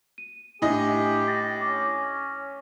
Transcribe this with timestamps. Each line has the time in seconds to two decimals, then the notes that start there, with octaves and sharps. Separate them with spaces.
0.18 D#7
0.62 A2 D4 G4 D#5 E5 G#5
1.27 A6 A#6
1.61 C#4 D6 A#6